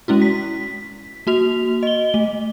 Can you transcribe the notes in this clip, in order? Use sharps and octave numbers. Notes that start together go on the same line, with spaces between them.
G#3 C#4 E4 F#4
B6
A#3 F#4 F7
D#5 G7
A3